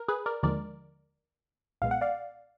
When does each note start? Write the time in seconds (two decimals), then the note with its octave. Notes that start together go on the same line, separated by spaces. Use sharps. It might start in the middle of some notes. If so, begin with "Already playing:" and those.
Already playing: A#4
0.08 G#4 B4
0.26 A#4 D5
0.43 D#2 D3 F3 G#3 A#4 D5
1.82 B1 A#2 G#3 B3 F5
1.91 F#5
2.01 D5 F5